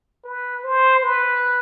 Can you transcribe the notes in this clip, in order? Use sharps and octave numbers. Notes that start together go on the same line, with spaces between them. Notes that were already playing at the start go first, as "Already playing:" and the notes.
B4
C5
B4